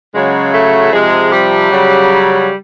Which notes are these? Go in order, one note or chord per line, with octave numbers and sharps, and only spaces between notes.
C#3 F#3 G#3
A3
C3 F3 G#3
G3
C#3 F#3